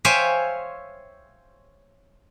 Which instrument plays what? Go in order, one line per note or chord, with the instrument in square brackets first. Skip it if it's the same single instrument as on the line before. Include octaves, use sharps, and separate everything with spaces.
[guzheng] C5 C#5 E5 F5 G5 G#5